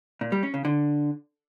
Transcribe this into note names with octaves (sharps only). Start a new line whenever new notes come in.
A#2
G3
C#4
C#3
D3